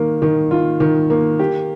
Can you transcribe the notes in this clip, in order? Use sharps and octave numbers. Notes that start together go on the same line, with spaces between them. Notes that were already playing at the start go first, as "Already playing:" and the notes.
Already playing: D#3 A#3
D#3
F4
D#3
A#3
G4